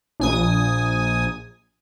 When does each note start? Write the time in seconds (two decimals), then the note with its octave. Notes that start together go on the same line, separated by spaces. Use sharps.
0.20 A#1 G#5 D#6